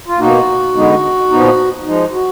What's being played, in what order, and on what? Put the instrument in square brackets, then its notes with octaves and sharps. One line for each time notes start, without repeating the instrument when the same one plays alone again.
[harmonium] F4
B2 A#3 D#4 F#4
D3 G#3 B3 D#4
A#2 F3 B3 D#4
F3 G#3 D#4
F#4